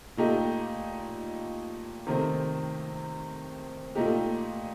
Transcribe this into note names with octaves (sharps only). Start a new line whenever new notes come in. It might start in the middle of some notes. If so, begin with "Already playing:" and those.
A#2 A3 D#4 G4
C3 D#3 A3 C4
A#2 A3 D#4 G4